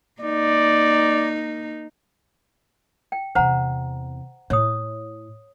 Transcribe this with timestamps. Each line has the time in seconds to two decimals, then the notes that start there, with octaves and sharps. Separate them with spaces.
0.21 A#3 D#4 D5
3.12 G5
3.35 E2 C3 C5 F#5 A#5
4.50 A2 E4 C#5 D#6